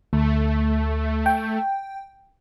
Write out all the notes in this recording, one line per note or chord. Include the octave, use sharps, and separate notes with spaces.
D2 A3
G5